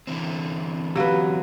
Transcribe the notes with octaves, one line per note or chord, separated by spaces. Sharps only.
D3 E3 C4
F#3 G4 B4 F5